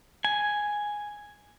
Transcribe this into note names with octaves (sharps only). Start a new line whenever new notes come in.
G#5